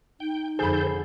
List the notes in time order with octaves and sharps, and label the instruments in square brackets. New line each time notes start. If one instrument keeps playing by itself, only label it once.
[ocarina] D#4 [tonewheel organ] G5
[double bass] F2 D3 [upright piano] G#4 B5 [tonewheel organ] A4 C5 G6